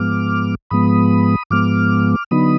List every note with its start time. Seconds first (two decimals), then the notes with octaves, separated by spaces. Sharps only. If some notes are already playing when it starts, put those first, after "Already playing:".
Already playing: G#2 F3 G#3 B3 D6 F6
0.71 G#2 F3 G#3 B3 B5 D#6
1.51 G#2 F3 G#3 B3 D6 F6
2.31 D3 F#3 B3 D#4 B5 D#6